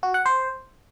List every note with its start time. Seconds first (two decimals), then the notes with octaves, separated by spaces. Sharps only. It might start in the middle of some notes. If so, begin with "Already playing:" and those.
0.03 F#4
0.14 F#5
0.26 C5